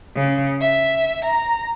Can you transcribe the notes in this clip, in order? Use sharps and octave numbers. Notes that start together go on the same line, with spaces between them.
C#3
E5
A#5